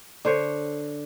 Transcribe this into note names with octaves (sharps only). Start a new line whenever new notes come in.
D3 C5 C#5